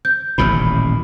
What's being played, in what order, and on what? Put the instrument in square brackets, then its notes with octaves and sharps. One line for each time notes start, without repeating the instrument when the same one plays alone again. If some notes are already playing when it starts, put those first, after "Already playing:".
[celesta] G6
[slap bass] D#1 A1 A2 [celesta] B5